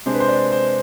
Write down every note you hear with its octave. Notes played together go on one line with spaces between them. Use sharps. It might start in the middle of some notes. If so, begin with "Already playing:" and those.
C3 G#3 D4 C5
B4
C5
D5
C5